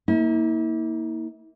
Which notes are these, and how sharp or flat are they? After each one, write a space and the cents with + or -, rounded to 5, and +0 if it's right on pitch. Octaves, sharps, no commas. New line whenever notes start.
A#3 +0 E4 -40